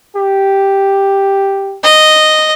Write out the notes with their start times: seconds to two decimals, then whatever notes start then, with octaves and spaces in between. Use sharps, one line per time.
0.16 G4
1.84 D#5